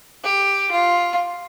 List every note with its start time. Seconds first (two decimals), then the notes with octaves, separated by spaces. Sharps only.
0.24 G4
0.72 F4